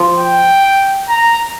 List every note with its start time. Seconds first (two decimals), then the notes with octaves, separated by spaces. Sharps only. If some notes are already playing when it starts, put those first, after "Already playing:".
Already playing: F3
0.17 G5
1.09 A#5